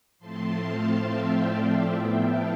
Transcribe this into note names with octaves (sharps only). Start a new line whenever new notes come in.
A2 F3 A3 C4 A5 C6
F5 A5
E5 G5
D5 F5
C5 E5
A2 F3 B3 E4 E5 G5
F5 A5